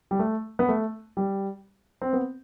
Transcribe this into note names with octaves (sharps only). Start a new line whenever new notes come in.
G3
A3
B3
A3
G3
C4
B3